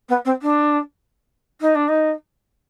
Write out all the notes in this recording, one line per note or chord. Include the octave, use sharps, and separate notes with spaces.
B3
C4
D4
D#4
D4
D#4